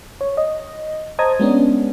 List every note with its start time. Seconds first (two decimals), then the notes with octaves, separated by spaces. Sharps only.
0.21 C#5
0.37 D#5
1.19 C5 D#5 A5 A#5 D#6 G#6
1.40 G#3 B3 C#4 D4